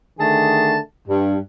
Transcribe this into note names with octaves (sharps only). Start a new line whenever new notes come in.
D3 D#3 A3 G#4 A5
G2